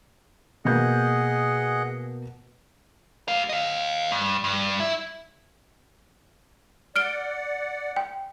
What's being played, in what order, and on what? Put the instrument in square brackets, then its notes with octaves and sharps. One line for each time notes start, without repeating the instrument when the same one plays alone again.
[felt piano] B2 A#3 G6 [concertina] G#4 D#5 F#5
[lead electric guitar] G4 F5
D#5 F5
G2
G2
E4
[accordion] D5 F#5 [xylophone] F6 D7 G7
[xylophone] G5